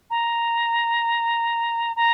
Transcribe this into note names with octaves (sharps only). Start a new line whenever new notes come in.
A#5
A#5